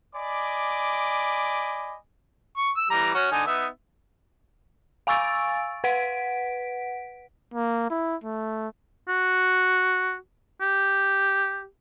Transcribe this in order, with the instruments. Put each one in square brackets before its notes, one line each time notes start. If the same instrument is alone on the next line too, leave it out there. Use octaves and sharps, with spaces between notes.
[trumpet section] D5 D#5 G#5 B5 D6
[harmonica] C#6
E6
E3 G3 A#5
C#4 F#4
D3 D#4 G#5
B3 D#4 E5
[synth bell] F5 G#5 C#6 E6 A6 D7
B4 F#5 B6 D7
[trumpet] A#3
E4
A3
[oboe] F#4
G4